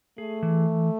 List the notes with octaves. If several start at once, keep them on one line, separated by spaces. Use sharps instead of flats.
A3 G#4
E3